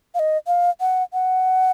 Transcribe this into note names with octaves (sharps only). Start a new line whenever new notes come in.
F5
D#5
F5
F#5
F#5